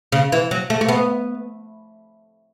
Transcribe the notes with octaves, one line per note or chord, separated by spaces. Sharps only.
C#3
E3
F#3
A3
A3
B3